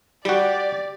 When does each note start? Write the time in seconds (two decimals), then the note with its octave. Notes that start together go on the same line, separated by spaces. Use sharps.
0.25 G3 F#4 G4 D5